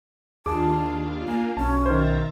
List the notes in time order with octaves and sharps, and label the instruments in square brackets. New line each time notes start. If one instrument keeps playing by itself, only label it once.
[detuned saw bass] D#2 [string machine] D4 F4 F5 [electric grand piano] G#4 D6 [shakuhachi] A5
[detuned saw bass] A#3 [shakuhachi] G#5
[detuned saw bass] B1 [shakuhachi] C#4 [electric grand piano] A5
[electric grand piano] D#3 C5 [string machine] E5 A#5 A6